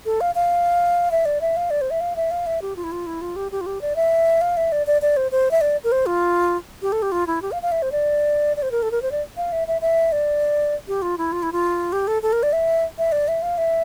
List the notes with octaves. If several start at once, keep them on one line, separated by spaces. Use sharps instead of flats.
A4
F5
F5
E5
D5
E5
F5
D5
C5
E5
F5
E5
F5
E5
G4
F4
E4
F4
E4
F4
G4
G4
F4
G4
D5
E5
F5
E5
D5
D5
D5
C5
C5
E5
D5
A#4
C5
F4
G4
A4
G4
F4
E4
G4
F5
F5
E5
C5
D5
D5
C5
A#4
A4
A#4
C5
D5
F5
E5
E5
E5
D5
G4
F4
E4
F4
E4
F4
G4
A4
A4
A#4
D5
E5
E5
D5
E5
F5
E5